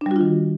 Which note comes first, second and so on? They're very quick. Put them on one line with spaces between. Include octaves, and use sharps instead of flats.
D4 G3 F#4 F4 D#3